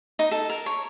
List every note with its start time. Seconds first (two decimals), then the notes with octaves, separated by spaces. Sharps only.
0.19 D#4
0.31 A4
0.50 A#4
0.66 C#5